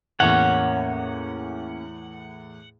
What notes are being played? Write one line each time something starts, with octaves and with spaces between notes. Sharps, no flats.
E2 A2 A#3 C#4 C#5 F#5